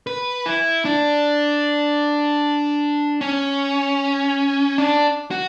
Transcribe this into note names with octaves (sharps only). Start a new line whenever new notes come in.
B4
E4
D4
C#4
D4
F#4